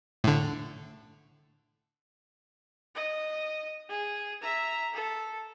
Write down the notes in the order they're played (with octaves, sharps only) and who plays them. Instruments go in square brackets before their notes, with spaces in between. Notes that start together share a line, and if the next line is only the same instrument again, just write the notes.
[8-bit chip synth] A2 D3
[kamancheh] D#5
G#4
E5 A#5
A4